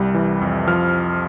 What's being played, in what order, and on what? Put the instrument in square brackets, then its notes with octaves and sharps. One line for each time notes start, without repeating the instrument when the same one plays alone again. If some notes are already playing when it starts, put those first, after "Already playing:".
Already playing: [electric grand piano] C2 G3
E3
F2
F3 F6